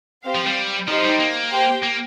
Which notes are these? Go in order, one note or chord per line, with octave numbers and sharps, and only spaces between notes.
C4 G4 C5 F5
F3
G3
F3 D#4 G4 C5
G3
A#3
G4 C5 G5
A#3